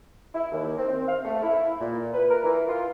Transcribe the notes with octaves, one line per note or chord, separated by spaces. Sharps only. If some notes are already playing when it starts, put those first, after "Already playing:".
E4
D#2
C4
F5
A3
E4
A#2
B4
A#4
E3
F4